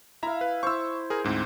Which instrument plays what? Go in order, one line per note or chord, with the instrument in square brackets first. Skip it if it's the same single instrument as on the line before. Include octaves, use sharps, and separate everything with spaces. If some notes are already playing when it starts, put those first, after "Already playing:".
[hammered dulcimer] E4 F5 [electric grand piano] E5 A#5
[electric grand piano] B4
[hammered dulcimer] E4 C5 [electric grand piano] C#6 E6
[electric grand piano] G#4 A#4
D2 G#2 C4